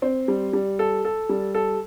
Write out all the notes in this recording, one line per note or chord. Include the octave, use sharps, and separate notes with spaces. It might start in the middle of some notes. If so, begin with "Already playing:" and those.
C4
G3
G3
A4
A4
G3
A4